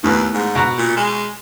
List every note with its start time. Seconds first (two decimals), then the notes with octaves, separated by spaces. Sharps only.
0.04 D#2 A2 D#3 B3
0.34 G#2
0.55 B2 F#4 A#5
0.78 A#2
0.97 G#3